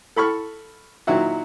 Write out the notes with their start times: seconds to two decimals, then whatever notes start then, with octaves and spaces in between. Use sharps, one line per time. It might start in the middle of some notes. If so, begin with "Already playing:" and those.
0.16 A4 B5 C#6 F6
1.07 A#2 D#3 F#3 E4 F#4